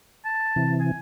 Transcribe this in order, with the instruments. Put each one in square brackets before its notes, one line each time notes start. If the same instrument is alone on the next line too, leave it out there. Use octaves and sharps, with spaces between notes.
[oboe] A5
[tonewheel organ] C3 E3
[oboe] G#5